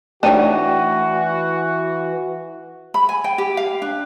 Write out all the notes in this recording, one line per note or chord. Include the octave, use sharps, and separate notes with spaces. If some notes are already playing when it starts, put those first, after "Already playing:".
E3 A3 D4 D#4 F#4 C#5 G5
B5
G#5
G5
G4
F5
D4